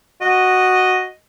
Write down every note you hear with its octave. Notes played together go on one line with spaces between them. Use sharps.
F#4 D#5